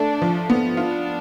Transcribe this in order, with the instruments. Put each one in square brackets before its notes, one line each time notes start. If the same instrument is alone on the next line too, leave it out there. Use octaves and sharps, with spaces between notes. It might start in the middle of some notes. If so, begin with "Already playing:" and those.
Already playing: [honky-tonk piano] A3 [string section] D4
[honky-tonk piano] F3
B3
[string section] D4 [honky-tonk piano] F4